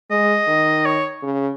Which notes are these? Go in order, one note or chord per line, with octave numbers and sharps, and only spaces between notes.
G#3 D#5
D#3
C#5
C#3